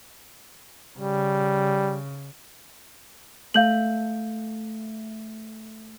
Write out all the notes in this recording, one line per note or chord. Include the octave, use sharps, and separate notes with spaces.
C#3 G3
A3 F5 G6 F#7